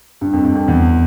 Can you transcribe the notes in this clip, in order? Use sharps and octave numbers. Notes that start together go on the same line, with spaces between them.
G2
F2
F2
F2
E2